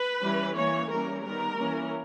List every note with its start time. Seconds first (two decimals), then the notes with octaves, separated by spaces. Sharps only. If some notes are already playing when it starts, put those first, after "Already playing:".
Already playing: B4
0.22 E3 G3 C#4
0.57 E3 A#3 C#4 C#5
0.91 E3 G3 A#3 C#4 A#4
1.25 D#3 G3 B3 A#4
1.58 E3 A#3 C#4